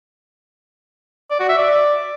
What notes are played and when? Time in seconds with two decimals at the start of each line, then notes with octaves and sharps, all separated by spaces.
1.31 D5
1.40 F#4
1.49 E5
1.58 D5